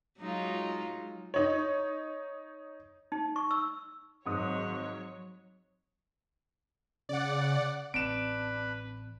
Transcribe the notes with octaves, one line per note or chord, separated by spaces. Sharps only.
F#3 G#3 D#4 F4
D#4 C#5
D#4
C#6
E6
G#1 G#2 F#3 C#5 D#6
C#3 D5 F#5
A1 C4 D4 B4 D7 E7